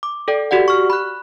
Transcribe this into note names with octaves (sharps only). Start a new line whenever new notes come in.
D6
A4 D5 G5
F#4 G4 D5 F#5
C#6 F6
B5 F#6